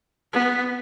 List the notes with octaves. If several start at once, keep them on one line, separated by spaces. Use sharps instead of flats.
B3